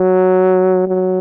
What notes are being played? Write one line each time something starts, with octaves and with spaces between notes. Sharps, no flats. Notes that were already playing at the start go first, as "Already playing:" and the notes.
Already playing: F#3
F#3